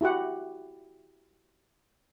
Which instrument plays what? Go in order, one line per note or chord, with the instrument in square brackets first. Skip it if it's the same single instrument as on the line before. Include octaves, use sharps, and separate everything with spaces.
[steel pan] E4 F#4 G4 F#5